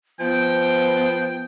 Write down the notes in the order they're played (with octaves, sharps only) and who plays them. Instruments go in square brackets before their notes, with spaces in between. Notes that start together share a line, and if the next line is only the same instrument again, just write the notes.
[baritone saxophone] F3 [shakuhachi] B3 [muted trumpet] G5